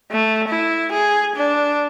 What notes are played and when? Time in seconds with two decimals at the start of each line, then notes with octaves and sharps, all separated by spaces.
0.11 A3
0.48 E4
0.92 G#4
1.36 D4